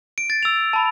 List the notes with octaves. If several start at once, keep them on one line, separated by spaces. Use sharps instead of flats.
D7
A6
E6 F7
A5 B5